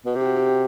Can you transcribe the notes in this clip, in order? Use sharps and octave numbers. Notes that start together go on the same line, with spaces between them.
B2
C3
G4
F#4
G4
G4